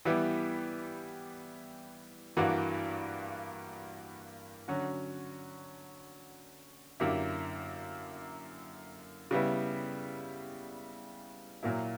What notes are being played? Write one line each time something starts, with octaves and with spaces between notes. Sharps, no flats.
E3 G3 B3 E4 G4
G2 E3 A#3 D4 F#4
D3 F#3 C#4 F#4
F#2 D3 A#3 E4 G4
C#3 G3 B3 E4
A#2 F#3 A#3 E4